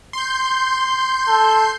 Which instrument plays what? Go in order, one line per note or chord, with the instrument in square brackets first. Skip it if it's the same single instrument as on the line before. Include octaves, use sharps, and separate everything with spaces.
[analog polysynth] C6 G6
[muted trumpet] A4